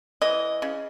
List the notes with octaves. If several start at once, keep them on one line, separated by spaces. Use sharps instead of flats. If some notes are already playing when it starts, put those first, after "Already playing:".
E3 D#5
C#3